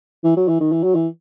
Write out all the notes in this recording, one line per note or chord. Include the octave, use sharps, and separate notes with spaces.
E3
F#3
E3
D#3
E3
F#3
E3